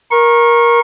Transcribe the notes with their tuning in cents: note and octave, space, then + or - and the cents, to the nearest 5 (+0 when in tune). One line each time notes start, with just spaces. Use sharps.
A#4 +15 C#6 -25